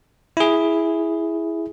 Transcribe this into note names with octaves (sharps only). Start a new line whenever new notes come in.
E4 G#4